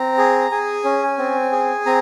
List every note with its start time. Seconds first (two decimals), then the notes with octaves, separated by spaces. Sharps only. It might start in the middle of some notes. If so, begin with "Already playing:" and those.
Already playing: C4 A#5
0.18 G#4
0.51 G#4 G#5
0.84 C#4
1.18 C4
1.52 G#4
1.86 C4 A#5